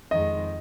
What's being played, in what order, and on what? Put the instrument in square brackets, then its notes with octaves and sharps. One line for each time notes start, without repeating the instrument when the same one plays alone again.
[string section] F2 D#3 G#3 [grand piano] D#5